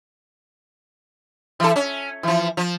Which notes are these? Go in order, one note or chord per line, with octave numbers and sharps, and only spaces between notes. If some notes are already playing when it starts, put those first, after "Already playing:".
E3 A4
C#4
E3 F3
F3